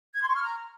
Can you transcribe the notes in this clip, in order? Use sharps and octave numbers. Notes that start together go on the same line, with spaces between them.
G#6
C6
C#6
F6
A#5